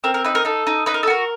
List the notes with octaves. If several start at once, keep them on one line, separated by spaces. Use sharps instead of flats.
C4 A#4
A#4
D#4 B4
A#4
D#4 A4
D#4
D#4 B4
A#4
A4
F#4 A#4